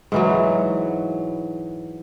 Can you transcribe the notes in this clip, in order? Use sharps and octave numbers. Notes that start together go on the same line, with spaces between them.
G#2 E3 F#3